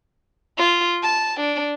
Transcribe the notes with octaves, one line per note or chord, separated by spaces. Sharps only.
F4
A5
D4